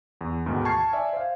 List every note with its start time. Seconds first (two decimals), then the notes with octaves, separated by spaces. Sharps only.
0.21 E2
0.46 D2 G#2 B2 D#3
0.65 A5 C#6 F6 G#6 C7
0.93 D5 E5 G#5
1.13 C5 F5